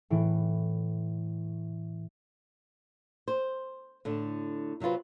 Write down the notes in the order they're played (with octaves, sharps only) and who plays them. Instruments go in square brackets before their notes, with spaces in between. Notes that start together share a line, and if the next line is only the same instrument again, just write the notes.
[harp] A2 E3 D7
[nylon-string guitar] C5
A2 D3
C3 F#3 C4 F4 B4